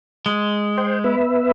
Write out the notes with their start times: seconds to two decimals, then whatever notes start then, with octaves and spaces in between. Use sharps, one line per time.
0.26 G#3
0.78 C5 G5
1.04 B3 B4 E5